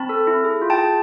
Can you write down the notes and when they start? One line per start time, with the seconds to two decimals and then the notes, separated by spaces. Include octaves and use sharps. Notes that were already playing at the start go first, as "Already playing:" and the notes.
Already playing: C4 A5 B5
0.09 A4
0.27 E4
0.44 G#4
0.62 F4
0.70 G5 A5
0.78 G#4